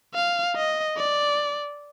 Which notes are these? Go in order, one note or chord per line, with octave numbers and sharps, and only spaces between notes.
F5
D#5
D5